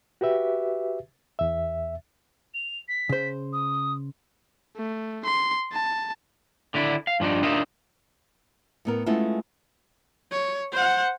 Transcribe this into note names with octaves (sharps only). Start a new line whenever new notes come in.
F#4 G4 B4 E5
E2 E5
F7
B6
C#3 C5
D#6
A3
C6
A5
D3 D4 E4
F5
G2 F3 D4 D#4
D4 D#4 F4 A#4 E5
A2 B3 A#4
G#3 A3 B3 C#4 E4 F4
C#5
C5 F#5